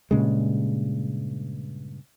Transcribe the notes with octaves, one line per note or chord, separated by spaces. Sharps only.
G2 A#2 C#3 G#3